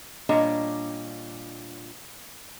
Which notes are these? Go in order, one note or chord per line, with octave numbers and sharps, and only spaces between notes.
A#2 G3 D4 C#5 D#5 A#5